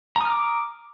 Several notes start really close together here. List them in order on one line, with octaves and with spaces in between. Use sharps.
A#5 D#6 F6 D6